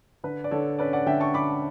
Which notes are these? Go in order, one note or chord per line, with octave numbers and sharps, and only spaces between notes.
D3 B4
D5
D3 A4 C#5
C#4 B4 D5
D5 F#5
D3 E5 G5
A5 C#6
D3 B5 D6